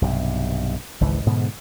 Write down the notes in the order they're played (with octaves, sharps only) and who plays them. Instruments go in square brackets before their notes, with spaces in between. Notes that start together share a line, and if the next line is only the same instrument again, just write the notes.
[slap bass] B1 G2 C3
G#1 C#2 E3
G#2 B2 D3 B3